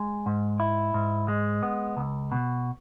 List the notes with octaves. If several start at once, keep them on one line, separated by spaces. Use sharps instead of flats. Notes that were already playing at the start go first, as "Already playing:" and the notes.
Already playing: G#3
G#2
E4
G#2
G#3
B3
C#2
B2